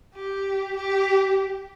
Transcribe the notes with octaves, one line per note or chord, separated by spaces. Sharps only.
G4
G4